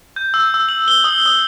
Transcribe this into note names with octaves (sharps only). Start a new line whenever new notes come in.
G6
E6
E6
F#7
G7
D#6
D#6